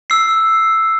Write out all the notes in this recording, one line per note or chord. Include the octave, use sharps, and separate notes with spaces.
E6 C7